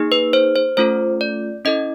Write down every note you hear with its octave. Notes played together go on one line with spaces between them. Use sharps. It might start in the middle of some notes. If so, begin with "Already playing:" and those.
Already playing: A#3 D#4 G#4
B4
C5
C5
A3 C#4 F4 A4 C5
D5
C#4 E4 A4 D#5